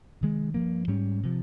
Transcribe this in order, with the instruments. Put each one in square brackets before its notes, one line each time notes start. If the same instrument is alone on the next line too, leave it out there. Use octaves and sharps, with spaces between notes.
[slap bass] C3 D#3 G#3
G2 F3 A#3
G#2 G3 C#4
C3 F3